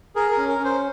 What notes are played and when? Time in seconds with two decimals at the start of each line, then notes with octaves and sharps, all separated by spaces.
0.16 G#4 A#4
0.31 A#4
0.38 C#4
0.48 A#4
0.58 C#4
0.64 C5